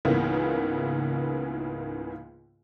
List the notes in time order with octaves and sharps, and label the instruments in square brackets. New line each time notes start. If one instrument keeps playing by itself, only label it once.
[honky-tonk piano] C#2 G#2 C#3 E3 A#3 B3